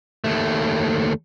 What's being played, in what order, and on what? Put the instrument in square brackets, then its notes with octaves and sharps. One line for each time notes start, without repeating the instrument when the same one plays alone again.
[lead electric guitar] D#2 A3